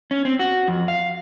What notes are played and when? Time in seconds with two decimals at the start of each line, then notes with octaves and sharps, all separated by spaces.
0.11 C#4
0.25 C4
0.39 F#4
0.68 F2
0.88 F5